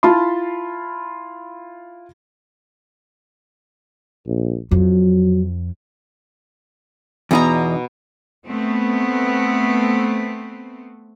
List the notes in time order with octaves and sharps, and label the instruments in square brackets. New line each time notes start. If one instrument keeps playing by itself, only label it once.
[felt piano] E4 F4 A5 B5 C6
[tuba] A#1
[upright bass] F2 [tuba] F#3
[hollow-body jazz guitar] E2 D#4 [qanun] B2 B3 A#5
[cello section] A3 B3 C4